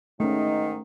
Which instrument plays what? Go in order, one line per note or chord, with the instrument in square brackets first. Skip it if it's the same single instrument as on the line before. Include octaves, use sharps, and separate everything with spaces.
[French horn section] G#2 D#4 [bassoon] D#3 [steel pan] A3 C#4